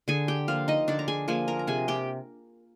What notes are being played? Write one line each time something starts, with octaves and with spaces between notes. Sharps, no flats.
D3 G#4 G#5
G4 G5
F3 A#3 F4 F5
D#4 D#5
D3 D4 D5
A#5
G#4 G#5
F3 A#3 G#4 G#5
A#4 A#5
A#5
C3 G#4 G#5
G4 G5